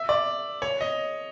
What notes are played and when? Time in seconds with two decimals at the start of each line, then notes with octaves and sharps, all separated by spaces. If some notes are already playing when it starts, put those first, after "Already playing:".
Already playing: E5
0.09 D5
0.62 C#5
0.81 D#5